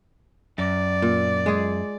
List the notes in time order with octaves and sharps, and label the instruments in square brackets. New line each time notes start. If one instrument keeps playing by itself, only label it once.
[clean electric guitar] F#2 [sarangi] D5
[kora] A#2
G#3 G#4